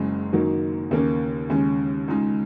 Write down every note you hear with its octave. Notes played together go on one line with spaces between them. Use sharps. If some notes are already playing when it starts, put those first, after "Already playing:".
Already playing: F#1 F#2 C#3 G#3
F#2 D#3 F#3 A#3 D#4
D#2 C#3 A#3 C#4
D#2 C#3 G#3 C#4
C#2 C#3 G#3 D#4